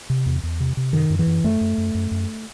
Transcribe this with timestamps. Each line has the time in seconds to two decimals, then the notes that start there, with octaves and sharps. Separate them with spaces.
0.10 C3
0.26 E2
0.43 E2
0.60 C3
0.77 C3
0.93 F#2 D#3
1.10 F#2
1.19 E3
1.27 F#2
1.44 F#2 A3
1.61 F#2
1.78 F#2
1.95 F#2
2.11 F#2